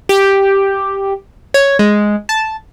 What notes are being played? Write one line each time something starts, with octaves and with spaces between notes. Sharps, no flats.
G4
C#5
G#3
A5